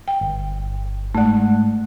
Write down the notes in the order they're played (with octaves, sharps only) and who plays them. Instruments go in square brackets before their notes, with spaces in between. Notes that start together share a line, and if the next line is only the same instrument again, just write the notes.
[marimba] G5
[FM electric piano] G1
[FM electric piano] G#2 F#5 [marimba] A3 D5